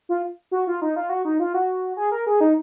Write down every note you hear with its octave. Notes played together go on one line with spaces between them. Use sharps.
F4
F#4
F4
D#4
F4
F#4
D#4
F4
F#4
G#4
A#4
G#4
D#4